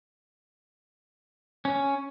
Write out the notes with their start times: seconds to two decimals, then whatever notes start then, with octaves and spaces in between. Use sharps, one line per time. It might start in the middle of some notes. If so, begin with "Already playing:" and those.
1.65 C#4